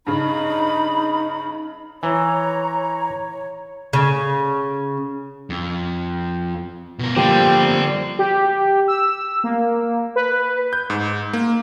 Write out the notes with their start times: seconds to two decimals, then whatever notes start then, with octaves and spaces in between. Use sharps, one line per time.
0.07 G2 C#3 D#4 B5
2.03 E3 C#5 A#5
3.93 C#3
5.50 F2
6.99 B2 A#4
7.16 D3 F3 G3 A#3 G4 C5 G5
8.19 G4
8.88 E6
9.44 A#3
10.16 B4
10.73 G6
10.90 G#2
11.33 A#3